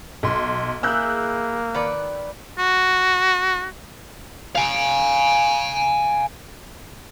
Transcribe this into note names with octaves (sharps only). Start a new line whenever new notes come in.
B1 C6
A#3 E4 G#4 E6 F#6 G6
D#3 B4 D5
F#4
F5 G#5